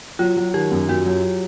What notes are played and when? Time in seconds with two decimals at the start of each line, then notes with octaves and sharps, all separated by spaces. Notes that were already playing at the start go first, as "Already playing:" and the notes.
0.19 F#3 F4
0.37 F#3
0.54 D#3 G4
0.72 F#2
0.89 F#2 F#4
1.06 F#3